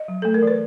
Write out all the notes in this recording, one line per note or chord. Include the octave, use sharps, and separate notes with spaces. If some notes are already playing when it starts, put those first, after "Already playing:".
Already playing: D#5
F#3
A3 A4
A#4
E3 B4